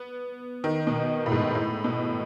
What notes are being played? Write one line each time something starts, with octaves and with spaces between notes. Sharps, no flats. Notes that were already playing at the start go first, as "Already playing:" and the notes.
Already playing: B3
D#3
B2
A2
G#2
A2
B2